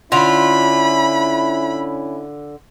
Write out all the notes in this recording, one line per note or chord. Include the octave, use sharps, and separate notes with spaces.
D3 C#4 E4 F4 B5